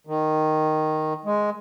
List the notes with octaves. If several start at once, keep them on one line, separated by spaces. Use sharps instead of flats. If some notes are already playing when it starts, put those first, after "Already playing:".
D#3
G#3